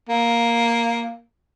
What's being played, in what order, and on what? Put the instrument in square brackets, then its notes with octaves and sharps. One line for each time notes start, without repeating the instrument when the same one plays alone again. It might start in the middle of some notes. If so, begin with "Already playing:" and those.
[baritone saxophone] A#3